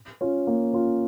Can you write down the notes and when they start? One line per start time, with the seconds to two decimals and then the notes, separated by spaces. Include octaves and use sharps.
0.21 C#4 F4
0.47 A#3
0.74 C#4 F4